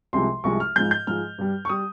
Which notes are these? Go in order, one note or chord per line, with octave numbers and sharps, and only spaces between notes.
C2 C3 F3 G#3 C6
C2 C3 F3 G#3 C#6
F6
G#2 F3 G#3 G6
G6
G#2 F3 G#3 F6
G2 G3
C#6
G3 D#6